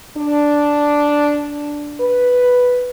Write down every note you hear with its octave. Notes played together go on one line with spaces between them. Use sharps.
D4
B4